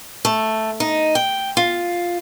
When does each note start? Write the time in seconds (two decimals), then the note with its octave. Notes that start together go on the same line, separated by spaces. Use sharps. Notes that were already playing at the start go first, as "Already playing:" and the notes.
0.25 A3
0.80 D#4
1.15 G5
1.57 F4